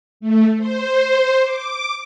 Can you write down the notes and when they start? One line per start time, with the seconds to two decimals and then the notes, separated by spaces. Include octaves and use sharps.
0.20 A3
0.58 C5
1.43 D6